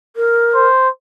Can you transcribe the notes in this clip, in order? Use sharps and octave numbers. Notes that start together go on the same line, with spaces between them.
A#4
C5